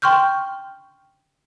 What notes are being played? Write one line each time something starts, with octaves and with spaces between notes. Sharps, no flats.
G5 C6 C#6 F6 G6